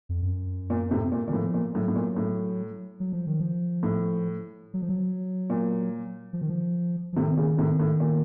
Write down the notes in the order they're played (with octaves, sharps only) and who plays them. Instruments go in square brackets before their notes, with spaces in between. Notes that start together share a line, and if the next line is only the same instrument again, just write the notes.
[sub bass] F2
F#2
[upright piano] A#2
A2 C3
A#2
[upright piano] A#2 [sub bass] D#3
[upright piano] A2 [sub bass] F3
[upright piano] A#2
[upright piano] A2 [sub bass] F#3
[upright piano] A2
A#2
A2
[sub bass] F#3
F3
D#3
F3
[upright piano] A2
[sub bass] F#3
F3
F#3
[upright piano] A#2
[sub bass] F3
D#3
F3
F3
[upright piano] A2 C3 [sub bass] D#3
[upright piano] A#2 C#3
A2 C3
A2
A#2